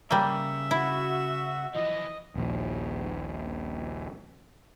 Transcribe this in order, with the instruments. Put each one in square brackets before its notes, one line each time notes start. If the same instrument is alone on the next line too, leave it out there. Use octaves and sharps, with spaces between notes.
[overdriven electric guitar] C#3 [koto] G3 A#3 [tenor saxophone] E5
[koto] E4 [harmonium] F#4
[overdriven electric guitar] E3 F3 [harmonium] D#5
[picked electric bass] D#1 A#1